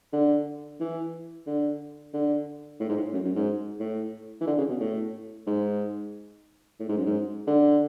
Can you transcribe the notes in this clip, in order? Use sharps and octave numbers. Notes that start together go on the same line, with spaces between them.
D3
E3
D3
D3
A2
G#2
A2
F#2
F#2
G#2
A2
E3
D3
C#3
B2
A2
G#2
A2
G#2
F#2
G#2
D3